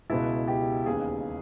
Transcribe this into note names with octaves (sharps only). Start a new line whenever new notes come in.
C#2 B2 E4
G4
E1 D#2 C#3 G#4